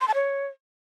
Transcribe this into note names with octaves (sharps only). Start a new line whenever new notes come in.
C6
A5
C#5